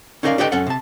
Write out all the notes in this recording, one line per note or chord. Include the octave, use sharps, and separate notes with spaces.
C#4 D#4 E4 A#4 D5 F5
D4 G4 A4 B4 D#5 G5
F#2 C#4 A4 F#5
C3 A5